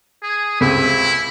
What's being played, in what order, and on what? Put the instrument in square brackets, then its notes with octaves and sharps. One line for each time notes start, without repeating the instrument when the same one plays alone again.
[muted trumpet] G#4
[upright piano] C#2 C3 [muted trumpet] E4